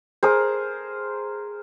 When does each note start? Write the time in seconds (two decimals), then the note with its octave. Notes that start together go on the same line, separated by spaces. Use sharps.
0.23 G#4 A#4 C5